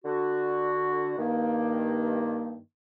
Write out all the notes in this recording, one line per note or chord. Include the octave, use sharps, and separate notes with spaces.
D3 F#4
G2 D#3 A#3